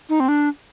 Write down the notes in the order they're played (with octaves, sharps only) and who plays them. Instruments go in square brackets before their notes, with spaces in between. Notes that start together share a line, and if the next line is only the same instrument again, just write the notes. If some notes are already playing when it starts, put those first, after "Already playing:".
[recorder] D#4
C4
D4